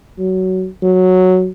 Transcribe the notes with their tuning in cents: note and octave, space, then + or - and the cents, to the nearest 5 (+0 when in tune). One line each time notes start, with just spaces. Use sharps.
F#3 +15
F#3 -5